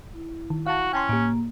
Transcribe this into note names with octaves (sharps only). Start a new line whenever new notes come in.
E4
D#3
F#4 F5 A5
C#4 G5 A5 C6
A2 A#3 G4